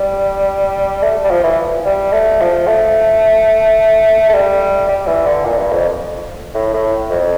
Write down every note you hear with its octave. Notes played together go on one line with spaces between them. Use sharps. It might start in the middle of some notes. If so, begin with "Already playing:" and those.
Already playing: G3
A3
G3
F3
E3
G3
A3
F3
A3
A3
G3
G3
E3
D3
A#2
G2
F2
A2
A2
F2